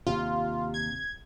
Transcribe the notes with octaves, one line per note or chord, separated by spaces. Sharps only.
D#2 C3 F4
G#6